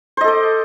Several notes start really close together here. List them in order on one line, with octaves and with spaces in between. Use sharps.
C5 D#5 A4 D6